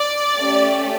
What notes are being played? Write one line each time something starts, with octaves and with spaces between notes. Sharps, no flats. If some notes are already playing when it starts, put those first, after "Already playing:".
Already playing: D5
A3 C#4 G4